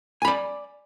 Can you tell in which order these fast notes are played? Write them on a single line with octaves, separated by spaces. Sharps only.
G#5 B5 D5